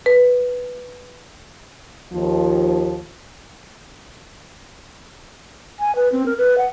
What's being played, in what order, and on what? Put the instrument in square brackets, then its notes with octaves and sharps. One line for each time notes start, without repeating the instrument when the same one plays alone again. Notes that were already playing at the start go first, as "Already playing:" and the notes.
[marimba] B4
[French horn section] D#2 F3
[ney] G#5
B4
C4
A#4
B4
F#5